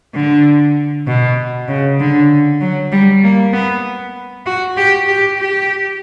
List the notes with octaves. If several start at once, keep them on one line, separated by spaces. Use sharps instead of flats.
D3
B2
C#3
D3
F#3
G3
A#3
B3
F#4
G4
G4
G4